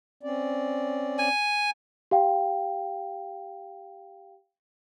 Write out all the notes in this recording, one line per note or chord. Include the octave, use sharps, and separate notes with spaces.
C4 C#4 D5
G#5
G4 F5 G5